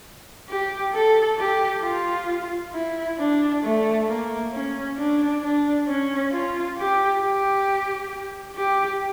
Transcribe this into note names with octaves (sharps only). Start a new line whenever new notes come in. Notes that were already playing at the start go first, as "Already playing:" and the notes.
G4
A4
G4
F4
E4
D4
A3
A#3
C#4
D4
D4
C#4
F4
G4
G4
G4